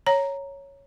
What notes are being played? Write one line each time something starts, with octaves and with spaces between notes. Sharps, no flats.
C#5 A#5